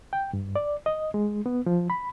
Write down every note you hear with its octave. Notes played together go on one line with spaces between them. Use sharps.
G5
G2
D5
D#5
G#3
B3
F3
B5